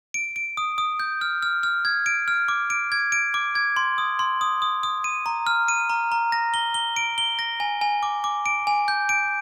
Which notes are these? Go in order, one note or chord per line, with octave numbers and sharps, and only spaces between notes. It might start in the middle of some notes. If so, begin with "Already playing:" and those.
D7
D7
D#6
D#6
G6
F6
F6
F6
G#6
D7
F6
D6
D7
G#6
D7
D6
G#6
C6
D#6
C6
D#6
D#6
D#6
D#7
A#5
F6
D#7
A#5
A#5
A#6
G7
G7
D7
G7
A#6
G#5
G#5
D6
D6
D7
G#5
G6
D7